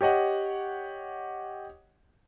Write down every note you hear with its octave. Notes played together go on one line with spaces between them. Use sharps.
G4 C#5 D#5 F#5